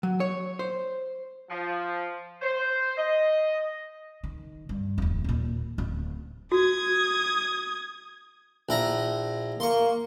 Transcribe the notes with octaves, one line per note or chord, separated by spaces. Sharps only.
F#3
C#5
C5
F3
C5
D#5
D#3
G2
D1 E2
D#2 A#2
D1
F#4 D#6 G#6
A#1 E4 A#5
A#3 C6 C#6